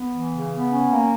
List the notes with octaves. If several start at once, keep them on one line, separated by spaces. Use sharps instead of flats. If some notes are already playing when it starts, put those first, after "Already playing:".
Already playing: B3
E3
C#3
B3
C#4
A#3